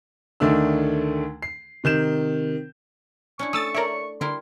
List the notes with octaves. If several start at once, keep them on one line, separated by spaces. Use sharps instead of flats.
D2 D#3 A3 D4 E6
C7
C3 D#3 G6 E7
C#4 D4 E4 C#6
A3 D#6 E6 A6
A4 A#4 C#5 D5 E5
D3 G3 E4 A#4 C6